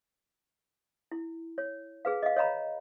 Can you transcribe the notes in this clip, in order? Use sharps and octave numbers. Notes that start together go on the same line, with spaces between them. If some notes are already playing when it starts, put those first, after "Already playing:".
E4
C#5
G#4 B4 F5
D#5 F5
C#5 D#5 F5 A#5 B5